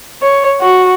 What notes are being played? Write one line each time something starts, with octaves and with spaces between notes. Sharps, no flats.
C#5
F#4